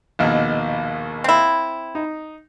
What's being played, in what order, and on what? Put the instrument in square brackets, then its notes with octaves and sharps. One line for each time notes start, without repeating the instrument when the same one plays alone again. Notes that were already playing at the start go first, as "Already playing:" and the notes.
[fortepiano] A#1 D#2 B2
[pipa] C4 E4
[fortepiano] D#4